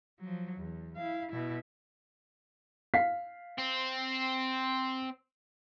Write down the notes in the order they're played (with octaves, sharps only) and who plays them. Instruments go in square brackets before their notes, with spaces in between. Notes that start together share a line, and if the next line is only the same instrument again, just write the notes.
[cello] F3 F#3
E2
E4 F5
B2 E4
[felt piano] F5 B6 C7
[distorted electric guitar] C4